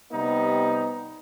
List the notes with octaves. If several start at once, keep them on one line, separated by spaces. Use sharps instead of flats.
C3 G3 B3 D#4